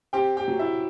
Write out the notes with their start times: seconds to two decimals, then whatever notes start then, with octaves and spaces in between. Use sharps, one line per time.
0.13 C4 G4 G5
0.37 G4 G5
0.48 F#3
0.59 E4 E5